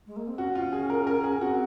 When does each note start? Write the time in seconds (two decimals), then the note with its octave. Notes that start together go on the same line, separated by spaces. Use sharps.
0.06 G#3
0.16 A#3
0.27 C4
0.38 C#4 F#4
0.55 F4
0.72 G#4
0.90 A#4
1.07 A#4
1.24 G#4
1.41 C4 F#4